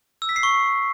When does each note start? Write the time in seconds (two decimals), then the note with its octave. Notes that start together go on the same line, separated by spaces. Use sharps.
0.22 E6
0.29 B6
0.36 C7
0.43 C#6